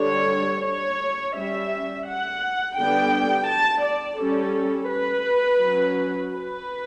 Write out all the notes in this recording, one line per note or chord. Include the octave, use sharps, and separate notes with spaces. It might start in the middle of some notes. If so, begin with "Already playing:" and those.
Already playing: D3 G3 D4 C#5
C#5
G3 C#4 E5
F#5
D3 G3 B3 D4 G5
A5
D5
G3 C#4 A4
B4
F#3 C#4
B4